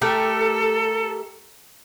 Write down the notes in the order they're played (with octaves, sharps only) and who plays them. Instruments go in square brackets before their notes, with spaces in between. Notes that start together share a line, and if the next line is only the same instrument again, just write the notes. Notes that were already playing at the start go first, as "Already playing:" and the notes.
[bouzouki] A3 G4 A#4 [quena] A4